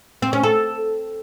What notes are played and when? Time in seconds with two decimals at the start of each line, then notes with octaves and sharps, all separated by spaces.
0.22 C4
0.33 C#4
0.43 A4